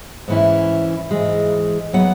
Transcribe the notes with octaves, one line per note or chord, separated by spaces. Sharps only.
G#2 E3 C#4 E4
G#2 E3 G#3
F#3 B3 E4 F#5